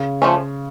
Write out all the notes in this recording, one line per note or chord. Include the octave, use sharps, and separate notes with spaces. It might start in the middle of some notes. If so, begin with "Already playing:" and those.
Already playing: C#3
F3 A3 C#4